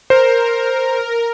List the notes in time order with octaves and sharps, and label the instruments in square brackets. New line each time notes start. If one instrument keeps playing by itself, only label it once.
[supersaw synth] A#4 [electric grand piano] C5